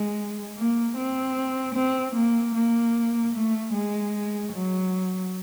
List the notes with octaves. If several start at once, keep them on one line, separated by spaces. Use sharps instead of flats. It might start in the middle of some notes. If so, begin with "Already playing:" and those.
Already playing: G#3
A#3
C4
C4
A#3
A#3
A3
G#3
F#3